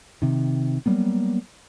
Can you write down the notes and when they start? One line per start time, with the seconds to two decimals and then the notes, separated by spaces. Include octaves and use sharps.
0.22 C3 D#3
0.86 F#3 G3 A#3 B3